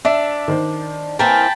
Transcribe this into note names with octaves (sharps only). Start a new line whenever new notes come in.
D4 E5
D#3 C5
E3 A#3 C4 A#4 G5 A5 B5